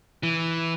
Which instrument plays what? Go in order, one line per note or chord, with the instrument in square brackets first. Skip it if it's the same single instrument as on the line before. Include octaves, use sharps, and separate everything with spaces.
[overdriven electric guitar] E3